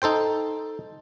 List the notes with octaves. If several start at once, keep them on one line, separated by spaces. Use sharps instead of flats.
D#4 A4 C5 G5